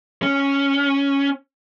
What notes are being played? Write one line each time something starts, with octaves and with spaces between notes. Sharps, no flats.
C#4